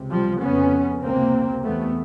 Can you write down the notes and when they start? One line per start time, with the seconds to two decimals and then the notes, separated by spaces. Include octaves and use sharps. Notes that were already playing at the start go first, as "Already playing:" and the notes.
Already playing: C#2 C3
0.10 F3 G3
0.41 F2 C#3 B3 C#4
1.02 C#2 C3 A#3 C4
1.64 E2 C3 A3 B3